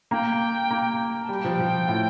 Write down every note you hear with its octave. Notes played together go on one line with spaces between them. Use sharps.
A#3 G5
A#3
A5
G3 G5
F3
F3
A2